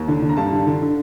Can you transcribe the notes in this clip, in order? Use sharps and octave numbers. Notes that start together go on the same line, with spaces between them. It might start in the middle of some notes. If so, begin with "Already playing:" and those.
Already playing: D#2
D3
D3
A#5
G2 A5
D3
D3
D3